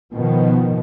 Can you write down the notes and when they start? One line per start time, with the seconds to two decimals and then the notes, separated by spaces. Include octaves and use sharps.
0.14 B2 D#3 F3 B3